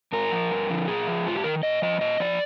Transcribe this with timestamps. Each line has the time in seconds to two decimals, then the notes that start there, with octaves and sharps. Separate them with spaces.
0.12 G#2 A#4
0.32 F3
0.51 G2
0.70 D3 F3
0.88 A#2 G#4
1.07 F3
1.26 G#2 F4
1.36 G4
1.44 D#3 A#4
1.63 A#2 D#5
1.82 F3 D#5
2.01 A#2 D#5
2.20 F3 D5